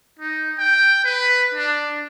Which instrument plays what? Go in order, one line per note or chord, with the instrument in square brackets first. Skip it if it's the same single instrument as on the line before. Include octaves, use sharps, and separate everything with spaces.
[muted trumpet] D#4
G5
B4
D4